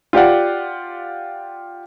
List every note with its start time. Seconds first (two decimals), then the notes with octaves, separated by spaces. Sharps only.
0.13 F4 G4 D5 F#5